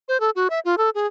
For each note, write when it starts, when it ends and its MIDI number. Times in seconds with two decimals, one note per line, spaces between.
0.08 0.20 72
0.20 0.30 69
0.36 0.48 66
0.50 0.60 76
0.65 0.75 65
0.78 0.90 69
0.95 1.07 68